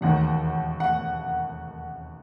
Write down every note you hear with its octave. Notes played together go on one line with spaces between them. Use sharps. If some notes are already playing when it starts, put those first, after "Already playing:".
E1 D#2 D#3 F#5
F#5